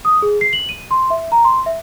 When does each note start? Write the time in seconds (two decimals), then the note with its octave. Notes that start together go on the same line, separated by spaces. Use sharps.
0.05 D#6
0.22 G#4
0.41 C7
0.53 F#7
0.69 D#7
0.91 C6
1.10 E5
1.32 A#5
1.45 C6
1.66 E5